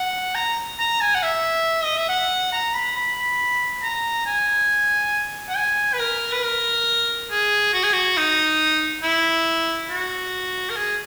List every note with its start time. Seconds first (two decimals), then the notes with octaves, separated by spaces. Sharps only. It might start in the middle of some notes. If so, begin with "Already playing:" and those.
Already playing: F#5
0.35 A#5
0.79 A#5
1.01 G#5
1.15 F#5
1.23 E5
1.84 D#5
1.97 E5
2.09 F#5
2.53 A#5
2.74 B5
2.96 B5
3.83 A#5
4.26 G#5
5.49 F#5
5.56 G#5
5.93 B4
5.99 A#4
6.32 B4
6.44 A#4
7.31 G#4
7.74 F#4
7.83 G#4
7.93 F#4
8.17 D#4
9.03 E4
9.90 F#4
10.70 A#4
10.77 G#4